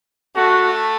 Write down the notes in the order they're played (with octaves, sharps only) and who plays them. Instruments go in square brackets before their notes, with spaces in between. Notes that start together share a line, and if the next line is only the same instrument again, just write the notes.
[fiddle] A3 [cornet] F#4